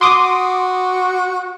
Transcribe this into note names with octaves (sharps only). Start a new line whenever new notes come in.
F#4 C6 D6 D#6